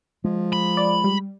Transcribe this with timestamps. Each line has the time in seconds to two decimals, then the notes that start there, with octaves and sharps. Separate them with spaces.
0.24 F3 G#3
0.52 B5
0.77 D5
1.04 G3